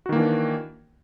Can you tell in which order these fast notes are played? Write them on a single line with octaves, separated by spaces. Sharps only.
F#4 D#3 A#3 E3 D4